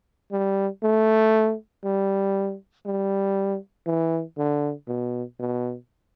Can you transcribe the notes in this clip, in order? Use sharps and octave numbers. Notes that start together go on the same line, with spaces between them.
G3
A3
G3
G3
E3
D3
B2
B2